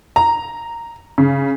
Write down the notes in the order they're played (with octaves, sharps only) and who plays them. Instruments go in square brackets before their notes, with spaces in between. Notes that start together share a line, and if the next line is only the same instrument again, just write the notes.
[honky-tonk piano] A#5
C#3